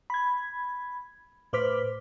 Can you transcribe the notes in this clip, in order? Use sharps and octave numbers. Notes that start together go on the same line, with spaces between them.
B5 G#6
A2 B4 C5 D6 F6 B6